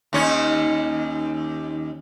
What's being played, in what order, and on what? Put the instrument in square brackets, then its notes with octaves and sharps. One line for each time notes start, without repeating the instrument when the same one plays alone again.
[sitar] D#2 C#4 D#4